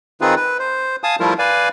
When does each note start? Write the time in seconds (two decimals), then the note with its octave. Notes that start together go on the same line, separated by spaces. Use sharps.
0.21 D#3 C4 D#4 F4 G#4 B4
0.36 B4
0.59 C5
1.04 F5 G#5 A5 D#6
1.20 F3 G3 A3 E4 F4 A#4
1.39 B4 D5 F5 G#5